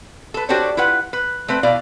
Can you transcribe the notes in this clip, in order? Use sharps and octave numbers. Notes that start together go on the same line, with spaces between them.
A4 B4
D4 F#4 G4 A4 C5 C#5
E4 F4 B4 F#5
B4
A3 C4 B4
B2 E4 D5 F5